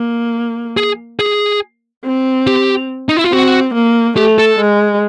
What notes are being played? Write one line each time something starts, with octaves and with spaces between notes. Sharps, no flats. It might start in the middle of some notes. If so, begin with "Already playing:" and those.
Already playing: A#3
G#4
G#4
C4
G4
D#4
E4
F4
C4 F#4
A#3
A3 G4
A4
G#3